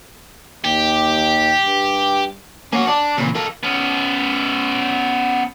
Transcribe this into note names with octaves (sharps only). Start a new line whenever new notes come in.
D#2 G4
G2
A#3 C#4 F#4
D4 D5
A#2 C#3 E3 C4
A4 A#4 F5
B3 C#4